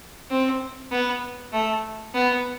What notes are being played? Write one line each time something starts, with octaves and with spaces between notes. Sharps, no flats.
C4
B3
A3
B3